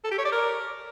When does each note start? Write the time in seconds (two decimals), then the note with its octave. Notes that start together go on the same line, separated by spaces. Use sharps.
0.04 A4
0.11 G4
0.18 C#5
0.25 D5
0.32 A#4